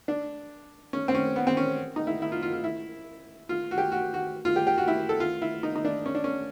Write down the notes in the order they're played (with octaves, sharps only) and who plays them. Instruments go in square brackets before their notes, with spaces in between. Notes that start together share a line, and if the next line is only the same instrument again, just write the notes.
[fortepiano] D4
C#4
C4
C#4
B3
C4
C#4
D#4
E4
E4
F4
F4
F4
E4
F4
F#4
G4
F#4
F#4
F4
G4
G4
F#4
E4
A4
F4
E4
D#4
D#4
D4
C#4
D4
C#4